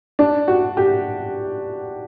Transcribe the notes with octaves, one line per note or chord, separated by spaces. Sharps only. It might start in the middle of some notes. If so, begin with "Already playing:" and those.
D4
F#4
G4